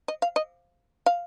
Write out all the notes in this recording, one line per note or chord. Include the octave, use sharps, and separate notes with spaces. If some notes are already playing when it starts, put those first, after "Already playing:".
D#5
F5
D#5
F5